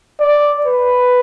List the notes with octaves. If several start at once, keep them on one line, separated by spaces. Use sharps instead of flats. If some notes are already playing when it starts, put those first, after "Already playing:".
D5
B4